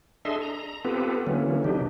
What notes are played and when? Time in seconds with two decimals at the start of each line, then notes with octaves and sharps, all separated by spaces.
0.25 D4 G#4 A4 D#5 E5 C6
0.42 A#5
0.85 B3 C4 F4 G4 A4 B4
1.27 D3 E3 F#3 A#3 C#4
1.64 C3 D4 D#4 G4